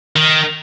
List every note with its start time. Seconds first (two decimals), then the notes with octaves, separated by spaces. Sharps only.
0.16 D#3